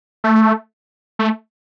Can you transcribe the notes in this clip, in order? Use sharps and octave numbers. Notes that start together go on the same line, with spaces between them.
A3
A3